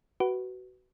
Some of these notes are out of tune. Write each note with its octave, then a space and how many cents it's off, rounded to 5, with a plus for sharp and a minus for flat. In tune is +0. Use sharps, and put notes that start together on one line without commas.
F#4 +20 B4 +0